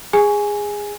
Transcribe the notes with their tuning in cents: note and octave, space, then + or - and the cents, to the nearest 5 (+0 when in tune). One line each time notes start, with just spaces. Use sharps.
G#4 -15 G#5 +0